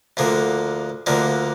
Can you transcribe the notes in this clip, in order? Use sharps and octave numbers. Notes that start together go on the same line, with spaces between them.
D2 D3 F3 A#3
D2 D3 F3 A#3